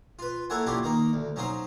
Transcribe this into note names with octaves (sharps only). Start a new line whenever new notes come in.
F4 B4
A#3 E4 A4 C#5 F#5 G#5
A#3 C#4 D4 E4 F4 G4
D#3 A#3 D#4
D2
F#3 C#4 D#4 C5 F5